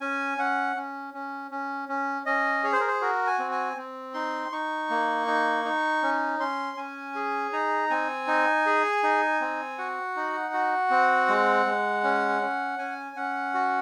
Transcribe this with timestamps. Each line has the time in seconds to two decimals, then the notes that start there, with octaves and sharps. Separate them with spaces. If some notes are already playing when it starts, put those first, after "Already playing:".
0.01 C#4 G#5
0.38 C#4 F#5
0.76 C#4
1.14 C#4
1.51 C#4
1.89 C#4
2.26 C#4 D#5
2.64 G#4 C#5
2.72 C5
2.80 A#4
2.88 C5
3.01 F#4 A#4
3.27 G#5
3.39 C4
3.52 G#5
3.77 C4
4.14 D#4 C6
4.52 D#4 C#6
4.90 A#3
5.27 D#4
5.65 D#4
6.03 C#4
6.39 C#4 C6
6.77 C#4 G#5
7.15 G#4
7.53 D#4 A#5
7.90 C4 G#5
8.28 D#4
8.66 G#4
9.03 D#4
9.41 C4
9.78 F#4 F#5
10.16 D#4
10.54 F#4
10.91 C4
11.29 G#3
11.66 G#3
12.04 C#4
12.42 C#4
12.78 C#4 G#5
13.16 C#4 F#5
13.54 F#4